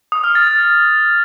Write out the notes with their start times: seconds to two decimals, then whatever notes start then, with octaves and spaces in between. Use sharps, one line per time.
0.12 D#6
0.24 F6
0.35 A6
0.47 A6